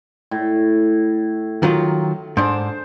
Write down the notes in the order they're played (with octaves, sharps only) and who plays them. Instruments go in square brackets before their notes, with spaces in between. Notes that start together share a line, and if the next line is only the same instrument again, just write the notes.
[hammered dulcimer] A2
[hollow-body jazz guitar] D#3 F#3 F4
[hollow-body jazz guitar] G#2 D4 [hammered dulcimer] C5